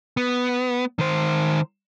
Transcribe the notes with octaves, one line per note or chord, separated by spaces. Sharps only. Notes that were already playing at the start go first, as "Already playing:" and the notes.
B3
D#3 C5